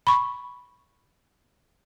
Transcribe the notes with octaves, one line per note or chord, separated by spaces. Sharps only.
B5 C#6